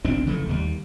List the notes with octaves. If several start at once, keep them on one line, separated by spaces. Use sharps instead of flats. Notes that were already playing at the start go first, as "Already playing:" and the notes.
F#1 B1 C4 D4
F1 C#3 E3 A3
D#2 G3